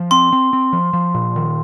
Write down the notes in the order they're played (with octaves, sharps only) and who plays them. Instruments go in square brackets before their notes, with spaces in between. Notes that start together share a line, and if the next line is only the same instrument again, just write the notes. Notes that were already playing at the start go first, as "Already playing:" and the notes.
Already playing: [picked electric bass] F3
[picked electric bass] C4 [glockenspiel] C6
[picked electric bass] C4
C4
F3
F3
A#2
D#3